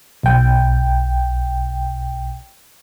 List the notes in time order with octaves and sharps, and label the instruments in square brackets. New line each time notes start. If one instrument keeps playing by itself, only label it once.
[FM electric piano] B1 G5